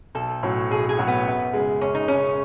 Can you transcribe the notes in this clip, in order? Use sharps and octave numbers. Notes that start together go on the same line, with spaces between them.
B1 A4
A2 F#3 C#4 F#4
B1 G#4
G#4
A2 F#3 C#4 F#4
B3
F#2
C#3 G#3
F#2 C#4
D#4
C#3 G#3 C#4